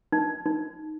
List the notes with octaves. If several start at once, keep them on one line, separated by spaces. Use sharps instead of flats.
D#4
D#4